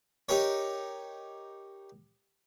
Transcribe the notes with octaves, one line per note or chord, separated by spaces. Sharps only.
D#4 G4 A#4 C#5